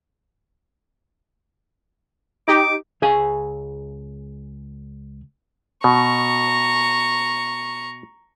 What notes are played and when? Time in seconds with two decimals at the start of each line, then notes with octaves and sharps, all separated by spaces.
2.48 D#4 G4 D6
3.02 C#2 G#4 F5 G#5
5.84 B2 A#5 C#6